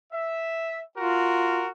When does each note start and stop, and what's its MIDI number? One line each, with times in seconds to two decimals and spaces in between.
0.13 0.82 76
0.97 1.65 65
0.97 1.68 66
0.97 1.68 70